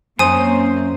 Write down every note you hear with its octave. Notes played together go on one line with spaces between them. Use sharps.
F#2 A#3 C4 C#4 C5 G#5 D#6